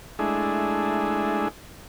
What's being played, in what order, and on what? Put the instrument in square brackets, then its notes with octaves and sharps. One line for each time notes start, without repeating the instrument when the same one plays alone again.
[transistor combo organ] G#3 A3 D4 E4 G#4